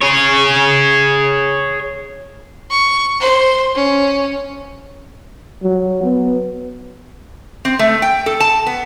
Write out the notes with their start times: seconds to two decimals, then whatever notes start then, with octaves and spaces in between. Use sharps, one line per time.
0.02 G#4 C#5
2.70 C#6
3.20 C5
3.75 C#4
5.63 F#3
6.04 B3
7.65 C4
7.79 A3
8.02 G5
8.26 A4
8.40 A5
8.67 B3